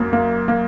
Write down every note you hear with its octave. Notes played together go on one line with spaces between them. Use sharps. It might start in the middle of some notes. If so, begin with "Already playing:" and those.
Already playing: F#2 A#3
A#3
A#3